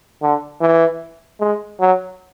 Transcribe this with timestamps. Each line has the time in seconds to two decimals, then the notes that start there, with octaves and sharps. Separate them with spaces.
0.22 D3
0.61 E3
1.40 G#3
1.80 F#3